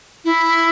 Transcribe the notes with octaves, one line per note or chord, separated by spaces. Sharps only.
E4